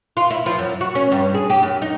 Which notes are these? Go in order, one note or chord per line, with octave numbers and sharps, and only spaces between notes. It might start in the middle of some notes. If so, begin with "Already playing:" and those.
F4
E4
F3
F#2
F#4
C#4
G2
G#4
G4
F#2
D#4